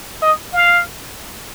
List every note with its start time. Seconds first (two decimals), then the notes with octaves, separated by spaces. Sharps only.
0.22 D#5
0.53 F5